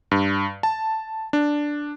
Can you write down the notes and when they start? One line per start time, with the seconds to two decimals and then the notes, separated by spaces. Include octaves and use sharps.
0.11 G2
0.63 A5
1.33 D4